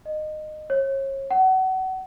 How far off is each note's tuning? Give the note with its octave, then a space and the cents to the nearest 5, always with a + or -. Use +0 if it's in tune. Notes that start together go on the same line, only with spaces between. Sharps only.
D#5 -20
C#5 -35
F#5 +30